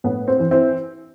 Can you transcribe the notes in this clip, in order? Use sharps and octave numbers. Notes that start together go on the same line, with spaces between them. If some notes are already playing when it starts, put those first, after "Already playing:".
A2 B3
C4
E3
C4 E4